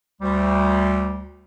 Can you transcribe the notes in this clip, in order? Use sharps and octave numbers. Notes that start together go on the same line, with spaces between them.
D2 G3